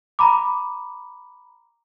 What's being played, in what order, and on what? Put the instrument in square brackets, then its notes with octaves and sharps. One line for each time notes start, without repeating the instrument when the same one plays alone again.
[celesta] A#5 B5 D6